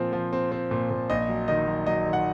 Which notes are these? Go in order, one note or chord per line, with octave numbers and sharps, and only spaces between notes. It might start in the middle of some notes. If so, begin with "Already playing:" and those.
Already playing: A#2 F3 C4
F3
C4
C4
A#2
A#2
A#1 D#5
F#3
D#3 D#5
F#3
F#3 D#5
D#3
F#5